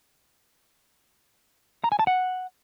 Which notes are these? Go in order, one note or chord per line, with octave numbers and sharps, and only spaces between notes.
A#5
G#5
A5
F#5